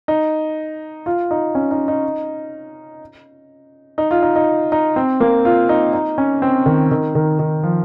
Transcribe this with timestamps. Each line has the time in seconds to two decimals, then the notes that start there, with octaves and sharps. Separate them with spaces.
0.08 D#4
1.06 F4
1.31 D#4
1.55 C#4
1.71 D#4
1.88 D#4
3.98 D#4
4.11 F4
4.22 D#4
4.36 D#4
4.72 D#4
4.96 C4
5.20 A#3
5.45 F4
5.69 D#4
5.93 D#4
6.18 C#4
6.42 C4
6.66 D#3
6.91 D#3
7.15 D#3
7.39 D#3
7.63 F3